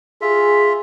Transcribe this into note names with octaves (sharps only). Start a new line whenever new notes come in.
F4 G#4 E5